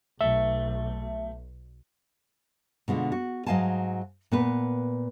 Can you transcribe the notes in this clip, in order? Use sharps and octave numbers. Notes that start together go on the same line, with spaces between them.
B1 A3 E5
B2 D3 G#3 F4
F#4
G#2 F#3 D#5 F5 G#5 A5
A#2 B3 B4